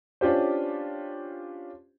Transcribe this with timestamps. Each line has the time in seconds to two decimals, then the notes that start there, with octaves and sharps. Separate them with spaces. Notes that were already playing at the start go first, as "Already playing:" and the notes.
0.21 C#4 D4 F4 G4 C5